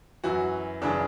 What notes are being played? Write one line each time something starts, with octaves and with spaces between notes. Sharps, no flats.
F#2 E3 F#4
F#2 C#3 E3 D4